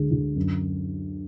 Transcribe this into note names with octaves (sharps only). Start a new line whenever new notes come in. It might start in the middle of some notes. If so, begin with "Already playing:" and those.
Already playing: D2 G#3
D2
F#2